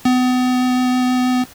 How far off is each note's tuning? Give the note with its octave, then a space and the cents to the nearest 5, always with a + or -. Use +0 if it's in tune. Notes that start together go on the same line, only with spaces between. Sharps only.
B3 +35